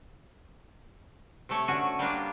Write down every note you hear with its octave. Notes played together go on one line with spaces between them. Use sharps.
C3 A3 C#5
D3 C#4 F#4
G3 A#3 D4 F4